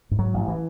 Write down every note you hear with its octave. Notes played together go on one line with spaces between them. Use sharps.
G#2
F#3
A1
E3